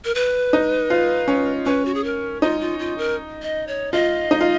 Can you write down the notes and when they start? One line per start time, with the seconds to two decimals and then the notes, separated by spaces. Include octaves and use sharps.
0.05 A#4
0.15 B4
0.53 D#4
0.90 F4
1.28 C#4
1.66 C#4 B4
1.85 F#4
1.94 G#4
2.04 A#4
2.42 D#4 F4
2.61 F4
2.79 F4
2.98 A#4
3.42 D#5
3.68 C#5
3.93 F4 D#5
4.31 D#4
4.41 F4